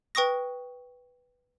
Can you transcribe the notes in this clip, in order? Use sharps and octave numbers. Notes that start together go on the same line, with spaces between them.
B4 G5 C#6 D#6 A#6